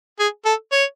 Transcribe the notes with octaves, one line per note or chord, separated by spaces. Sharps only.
G#4
A4
C#5